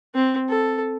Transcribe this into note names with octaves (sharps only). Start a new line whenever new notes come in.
C4
A4